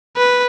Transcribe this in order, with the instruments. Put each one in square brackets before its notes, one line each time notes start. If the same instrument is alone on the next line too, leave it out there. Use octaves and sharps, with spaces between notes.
[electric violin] B4